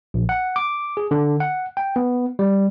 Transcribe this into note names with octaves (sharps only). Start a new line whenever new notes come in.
A#1
F#5
D6
G#4
D3
F#5
G5
B3
G3